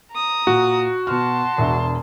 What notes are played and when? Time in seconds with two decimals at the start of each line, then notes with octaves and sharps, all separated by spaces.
0.13 A#5 D#6
0.47 A#2 F#4
1.07 B2 A5 C6 C#6 F6
1.58 E1 D4 E5